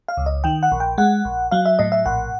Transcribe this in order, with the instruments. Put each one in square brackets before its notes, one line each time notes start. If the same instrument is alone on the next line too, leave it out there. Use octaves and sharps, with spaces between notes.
[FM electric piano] F5
C#2
D#5
D#3 G5
F#5
A#1
G5
G#3 F#5
A#1
F#3 F5
E5
A2 D#5
E5
A#1 F#5